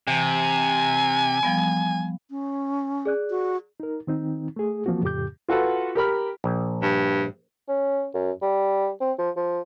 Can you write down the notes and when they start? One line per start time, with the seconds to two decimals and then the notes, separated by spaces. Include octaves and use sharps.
0.07 C3 E3 G#5
1.43 F3 G3 B3
2.30 C#4
3.05 G#4 D5 F#6
3.30 F#4
3.80 D#4 A#4
4.07 D#3 C4 D#4
4.56 A3 G#4
4.86 E3 F3 A#3 C4 F#4
5.03 F2 A2 C#3 G4 D6 G6
5.48 F4 F#4 A4 B4 F#5
5.95 G4 A#4 B5 F6
6.44 A#1
6.82 G2
7.68 C#4
8.14 F#2
8.42 G3
9.01 C4
9.19 F3
9.36 F3